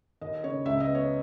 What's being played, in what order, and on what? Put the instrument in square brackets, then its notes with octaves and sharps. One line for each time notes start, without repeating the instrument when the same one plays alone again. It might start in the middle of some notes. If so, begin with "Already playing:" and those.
[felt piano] D#2 D#5
C#3 C#5
C#2 E5
D#5
B3
C#5